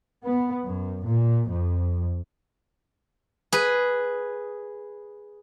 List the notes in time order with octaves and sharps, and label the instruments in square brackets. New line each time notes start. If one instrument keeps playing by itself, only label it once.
[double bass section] B3
F#2
A#2
F2
[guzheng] G#4 B4